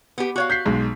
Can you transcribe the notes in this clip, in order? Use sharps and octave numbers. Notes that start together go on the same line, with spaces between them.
B3 G4
F#4 C#5 F5
G6 B6 C7
B1 G#3